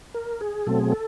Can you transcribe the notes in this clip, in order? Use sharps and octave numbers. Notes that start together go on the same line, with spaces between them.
A#4
G#4
B2 F#3 A3 C4 A4
G#4
A4